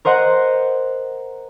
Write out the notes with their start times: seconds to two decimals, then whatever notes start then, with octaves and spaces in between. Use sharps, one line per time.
0.05 A#4 C5 D#5 F#5